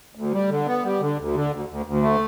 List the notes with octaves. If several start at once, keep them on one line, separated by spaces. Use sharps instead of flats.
D2
G3
D3
B3
G3
D3
D2
D3
D2
D2
D2
A3